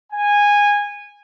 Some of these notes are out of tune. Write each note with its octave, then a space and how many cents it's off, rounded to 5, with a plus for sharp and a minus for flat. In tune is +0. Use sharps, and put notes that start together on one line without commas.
G#5 -15